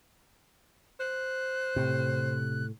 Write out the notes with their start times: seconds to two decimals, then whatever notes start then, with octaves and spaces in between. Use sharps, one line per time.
1.00 C5 F#6
1.76 A2 C3